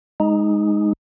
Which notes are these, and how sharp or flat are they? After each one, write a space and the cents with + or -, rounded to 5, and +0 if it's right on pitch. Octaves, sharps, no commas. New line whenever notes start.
G#3 +0 D#4 +0